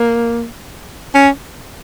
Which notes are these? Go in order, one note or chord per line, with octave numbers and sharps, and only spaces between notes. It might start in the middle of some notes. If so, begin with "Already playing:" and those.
Already playing: A#3
C#4